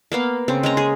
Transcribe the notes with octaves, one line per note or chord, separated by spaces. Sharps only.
A#3 B3 F5
C#3 C4
G#3 C#4 A#5
G#4